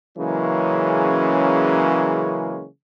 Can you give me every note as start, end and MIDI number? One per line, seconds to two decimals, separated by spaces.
0.18 2.66 49
0.18 2.66 52
0.18 2.66 54
0.18 2.66 56
0.18 2.66 58
0.18 2.66 61